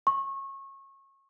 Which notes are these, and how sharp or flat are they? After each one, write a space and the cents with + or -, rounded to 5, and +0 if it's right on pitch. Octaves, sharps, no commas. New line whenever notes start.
C#6 -25